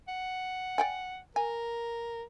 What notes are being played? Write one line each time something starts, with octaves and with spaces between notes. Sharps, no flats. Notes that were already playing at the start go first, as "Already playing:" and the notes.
F#5
D5 G5 G#5
A#4 G#5